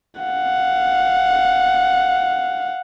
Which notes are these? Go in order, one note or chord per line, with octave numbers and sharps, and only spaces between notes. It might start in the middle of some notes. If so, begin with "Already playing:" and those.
F5 F#5